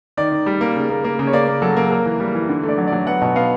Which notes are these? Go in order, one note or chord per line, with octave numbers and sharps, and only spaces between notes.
D#3 D5
D#3
G3
A#3
C#3
A#3
A#3
C#3
C#5
A#3 D5
A#3
F#3 A4
A#3
A#3 A#4
E3
G3
E3
D3
A3
D5
F#3
D5
F#3
B3 F#5
B2
B3 F5